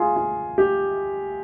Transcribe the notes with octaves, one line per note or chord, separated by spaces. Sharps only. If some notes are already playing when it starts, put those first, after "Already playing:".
Already playing: F4 G#4
F4
G4